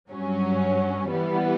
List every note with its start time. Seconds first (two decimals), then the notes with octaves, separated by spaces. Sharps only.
0.10 G2 F#3 C#4
1.09 E3 G3 B3